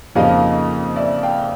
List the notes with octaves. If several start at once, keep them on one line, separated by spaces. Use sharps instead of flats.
F2 C#3 F3 A#3 D#4 D#5 F5
D5 E5
F5 G5